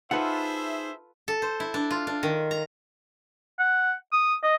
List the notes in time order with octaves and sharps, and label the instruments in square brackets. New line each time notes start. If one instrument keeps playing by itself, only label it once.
[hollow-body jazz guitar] D#4 F#5 [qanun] F4 A4 B4 [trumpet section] G#4 C5 E5
[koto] A4
C5
E4
D4
F4
D4
D#3
A#5
[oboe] F#5
D#6
D#5